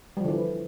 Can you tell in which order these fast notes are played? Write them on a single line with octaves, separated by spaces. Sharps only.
G3 F3 D3 E3